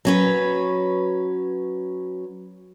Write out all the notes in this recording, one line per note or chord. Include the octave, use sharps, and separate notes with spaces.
F#3 C#4 B4